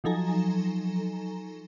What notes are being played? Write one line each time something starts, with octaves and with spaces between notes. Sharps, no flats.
F3 F#3 D#4 A4 G#5 A#5